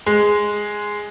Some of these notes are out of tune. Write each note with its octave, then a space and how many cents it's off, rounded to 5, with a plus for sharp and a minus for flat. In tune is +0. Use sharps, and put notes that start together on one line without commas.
G#3 +0